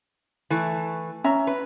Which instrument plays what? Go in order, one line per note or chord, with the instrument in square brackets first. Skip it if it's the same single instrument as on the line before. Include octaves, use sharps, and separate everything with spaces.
[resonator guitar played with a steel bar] E3 A3
[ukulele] C#4 E5 A#5
[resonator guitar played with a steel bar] B4